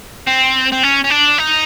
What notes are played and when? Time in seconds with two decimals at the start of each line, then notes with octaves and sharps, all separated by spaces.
0.27 C4
0.72 C4
0.83 C#4
1.04 C#4
1.10 D4
1.38 D#4